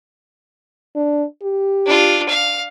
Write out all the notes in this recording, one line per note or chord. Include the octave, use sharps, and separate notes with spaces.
D4
G4
D4 F4
F5